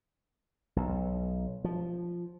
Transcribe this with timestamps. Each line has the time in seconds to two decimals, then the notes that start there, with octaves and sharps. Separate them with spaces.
0.76 B1
1.64 F3